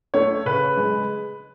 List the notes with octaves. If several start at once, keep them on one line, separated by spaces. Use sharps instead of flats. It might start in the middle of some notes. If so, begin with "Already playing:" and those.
A3 C#5
C#3 B4
G#3